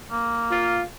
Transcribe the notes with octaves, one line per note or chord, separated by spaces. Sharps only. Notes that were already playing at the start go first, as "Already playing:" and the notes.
A#3
F4